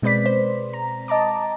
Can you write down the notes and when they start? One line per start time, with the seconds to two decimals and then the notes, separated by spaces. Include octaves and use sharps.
0.02 B2 G#3 C4 B4 D5 B6
0.26 C5
0.73 A#5
1.08 D#5 A5 A#5 D6